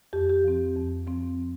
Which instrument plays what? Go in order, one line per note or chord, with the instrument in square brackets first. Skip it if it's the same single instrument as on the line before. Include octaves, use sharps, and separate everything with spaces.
[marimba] F2 G4
G4
F3 C4
F2
F3 C4